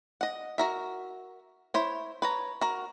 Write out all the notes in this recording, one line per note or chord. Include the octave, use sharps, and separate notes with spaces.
D#5 F#5
F#4 A#4 E5
E4 C5 C#5
B4 C#5 A#5
F#4 A#4